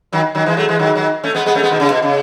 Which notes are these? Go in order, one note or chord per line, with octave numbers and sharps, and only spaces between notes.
D#3 F#3
D#3 F#3
E3 G#3
F#3 A3
E3 G#3
D#3 F#3
D#3 F#3
A3 C#4
G#3 B3
G#3 B3
A3 C#4
G#3 B3
B2 D#3
C#3
B2
C#3